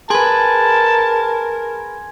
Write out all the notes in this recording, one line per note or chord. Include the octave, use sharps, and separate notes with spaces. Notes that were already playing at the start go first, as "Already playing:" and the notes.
G#4 A#4 B4 G#5 A5 C6 G#6